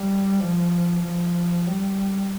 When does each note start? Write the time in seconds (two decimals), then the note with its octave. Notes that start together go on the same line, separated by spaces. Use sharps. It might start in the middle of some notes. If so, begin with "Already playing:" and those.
Already playing: G3
0.40 F3
1.03 F3
1.67 G3